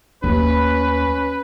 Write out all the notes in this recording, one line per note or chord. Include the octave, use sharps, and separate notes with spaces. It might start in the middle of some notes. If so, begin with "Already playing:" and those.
D#2 A3 C#4 B4